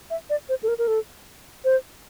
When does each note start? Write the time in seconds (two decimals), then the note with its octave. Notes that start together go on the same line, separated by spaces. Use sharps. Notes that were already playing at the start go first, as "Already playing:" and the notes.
0.10 E5
0.30 D5
0.49 C5
0.63 A4
0.68 A#4
0.78 A#4
0.87 A4
1.64 C5